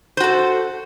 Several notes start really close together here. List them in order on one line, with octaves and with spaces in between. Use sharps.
C5 F#4 A4